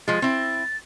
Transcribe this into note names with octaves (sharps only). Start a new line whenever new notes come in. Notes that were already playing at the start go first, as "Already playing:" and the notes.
F3 G#3 A6
C4 E4